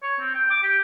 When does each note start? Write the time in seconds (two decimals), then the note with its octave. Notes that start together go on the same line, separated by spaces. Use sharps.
0.03 C#5
0.20 C4
0.35 G5
0.51 D6
0.63 G4